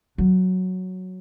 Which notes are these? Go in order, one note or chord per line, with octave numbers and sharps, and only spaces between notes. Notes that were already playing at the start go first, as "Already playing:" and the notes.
F#3